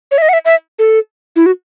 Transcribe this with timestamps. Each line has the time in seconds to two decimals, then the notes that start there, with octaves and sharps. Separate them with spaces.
0.11 C#5
0.18 E5
0.22 D#5
0.29 F#5
0.33 E5
0.45 E5
0.79 A4
1.36 E4
1.46 F#4